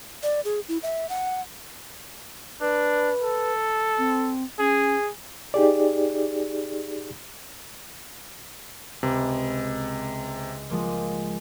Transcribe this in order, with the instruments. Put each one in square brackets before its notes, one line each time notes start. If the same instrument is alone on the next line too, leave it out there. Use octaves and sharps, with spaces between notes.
[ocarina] D5
G#4
E4
E5
F#5
[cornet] D4 [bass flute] B4
[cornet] A4
[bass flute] C4
[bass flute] C#4 [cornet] G#4
[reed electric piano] D#4 G4 G#4 D5
[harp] C#2 [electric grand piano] C3
[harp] F3 G#3 A#3